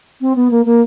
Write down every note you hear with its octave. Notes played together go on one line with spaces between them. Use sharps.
C4
B3
A#3
A#3